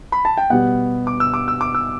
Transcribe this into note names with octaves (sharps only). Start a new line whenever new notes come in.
B5
A5
G5
B2 G3 B3 F#5
D6
E6
D6
E6
D6
E6